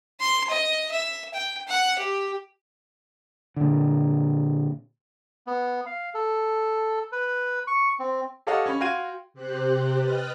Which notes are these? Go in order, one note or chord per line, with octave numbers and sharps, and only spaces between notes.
C6
D#5
E5
G5
F#5
G4
A#2 D3
B3
F5
A4
B4
C#6
C4
G4 A4 C#5 D#5 F5 F#5
C#4 C#5 B5
F#4 F5 G5 C6 G#6 D#7
C3 G4 C5 F#6
B4 D#5 G5 F6 F#6 A6